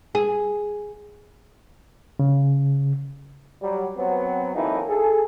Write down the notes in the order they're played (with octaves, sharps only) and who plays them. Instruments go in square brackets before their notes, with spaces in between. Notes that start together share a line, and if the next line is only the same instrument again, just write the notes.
[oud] G#4
[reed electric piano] C#3
[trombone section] F#3 G3
F#3 B3 C4
F2 E3 F#3 A#3 D#4 E4
G#4 A4